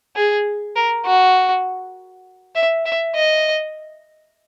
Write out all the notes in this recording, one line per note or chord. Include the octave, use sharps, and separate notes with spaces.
G#4
A#4
F#4
E5
E5
D#5